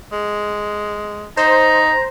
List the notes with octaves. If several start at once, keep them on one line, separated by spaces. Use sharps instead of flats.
G#3
D#4 C5 A#5